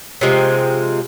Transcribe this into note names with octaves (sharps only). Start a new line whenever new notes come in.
C3 F3 G#3 C4